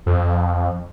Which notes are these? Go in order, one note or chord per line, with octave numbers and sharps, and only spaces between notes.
F2